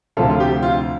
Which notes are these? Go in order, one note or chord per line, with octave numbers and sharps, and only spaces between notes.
D2 C3 F3 F4 A4
F4
G4
F4